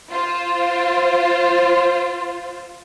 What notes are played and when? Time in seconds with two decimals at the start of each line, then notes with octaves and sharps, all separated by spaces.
0.11 F4 C5